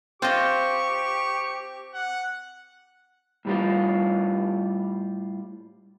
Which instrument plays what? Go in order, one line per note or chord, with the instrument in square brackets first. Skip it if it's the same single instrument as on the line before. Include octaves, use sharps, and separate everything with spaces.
[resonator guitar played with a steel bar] C4 [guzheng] F4 D#5 [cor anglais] G4 [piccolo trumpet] C#6
[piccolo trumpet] F#5
[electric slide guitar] A2 G3 F4